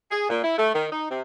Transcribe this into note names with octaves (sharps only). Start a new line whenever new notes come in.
G#4
A#2
E4
A3
D#3
D#4
C3